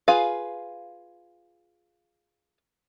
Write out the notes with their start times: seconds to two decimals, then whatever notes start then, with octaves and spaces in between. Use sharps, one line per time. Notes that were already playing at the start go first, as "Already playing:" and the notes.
0.08 F4 G#4 B4 F5